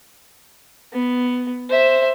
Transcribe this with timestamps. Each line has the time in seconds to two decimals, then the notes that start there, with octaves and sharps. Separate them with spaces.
0.92 B3
1.70 C5 E5